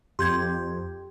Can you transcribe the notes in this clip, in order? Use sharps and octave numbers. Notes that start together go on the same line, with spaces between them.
F2 G4 C6 G6 G#6